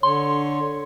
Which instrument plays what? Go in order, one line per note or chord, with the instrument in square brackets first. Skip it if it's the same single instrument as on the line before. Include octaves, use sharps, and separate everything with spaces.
[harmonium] D3 C#5 [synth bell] C6